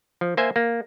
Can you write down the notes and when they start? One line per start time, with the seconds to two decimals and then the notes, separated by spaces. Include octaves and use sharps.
0.21 F3
0.37 A#3 C5 E5 G#5
0.56 A#3